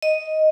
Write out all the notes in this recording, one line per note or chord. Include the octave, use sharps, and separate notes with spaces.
D#5